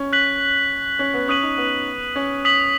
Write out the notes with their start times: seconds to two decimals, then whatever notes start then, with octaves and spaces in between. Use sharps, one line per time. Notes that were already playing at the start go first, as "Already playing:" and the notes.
Already playing: C#4
0.13 F#6 B6 F#7
0.99 C#4
1.14 B3
1.28 C#4 D#6 F#6 B6 D#7 F#7
1.43 D#4
1.58 B3
2.16 C#4
2.45 D#6 B6 F#7